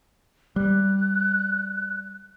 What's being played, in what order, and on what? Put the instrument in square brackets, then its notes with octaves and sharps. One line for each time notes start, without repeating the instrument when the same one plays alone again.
[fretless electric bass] G3 [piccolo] F#6